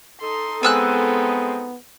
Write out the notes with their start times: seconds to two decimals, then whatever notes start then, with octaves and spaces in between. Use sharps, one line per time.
0.21 D#4 A4 C6
0.63 G#3 B3 C4 G#5 E6 F#6